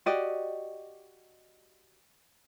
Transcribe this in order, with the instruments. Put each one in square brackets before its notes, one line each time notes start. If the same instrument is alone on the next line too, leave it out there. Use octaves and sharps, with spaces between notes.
[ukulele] F#4 G4 D5 D#5